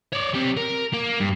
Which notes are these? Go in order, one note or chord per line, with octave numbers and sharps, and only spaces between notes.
C#5 D5
G3 C4
A#4
A#3
G2